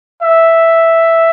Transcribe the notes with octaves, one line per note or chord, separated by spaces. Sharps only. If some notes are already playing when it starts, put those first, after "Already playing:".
E5